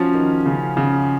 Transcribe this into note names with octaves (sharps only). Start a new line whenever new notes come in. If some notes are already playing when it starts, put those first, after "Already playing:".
Already playing: F3 C#4 F4 F#4
D#3
C#3
C#3